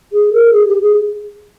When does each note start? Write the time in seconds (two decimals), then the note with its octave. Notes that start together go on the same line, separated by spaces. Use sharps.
0.12 G#4
0.33 A#4
0.53 G#4
0.67 G4
0.82 G#4